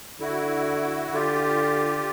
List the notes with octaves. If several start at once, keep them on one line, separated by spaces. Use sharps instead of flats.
D3 E4 F#4
D3 F4 G4